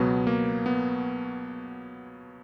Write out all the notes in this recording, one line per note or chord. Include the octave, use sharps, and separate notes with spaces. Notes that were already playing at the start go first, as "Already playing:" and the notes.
Already playing: C#2 B2 F#3 B3
A#3
B3